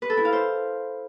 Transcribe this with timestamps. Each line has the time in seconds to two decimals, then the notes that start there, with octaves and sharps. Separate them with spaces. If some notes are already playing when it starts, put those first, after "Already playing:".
0.02 B4
0.10 A4
0.17 E4
0.25 F5
0.33 C5